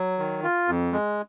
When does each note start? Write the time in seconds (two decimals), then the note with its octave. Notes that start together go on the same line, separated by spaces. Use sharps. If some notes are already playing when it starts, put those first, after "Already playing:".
Already playing: F#3
0.19 D#3
0.43 F4
0.68 F2
0.93 G#3